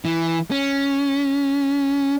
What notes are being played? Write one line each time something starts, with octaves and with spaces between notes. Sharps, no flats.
E3
C#4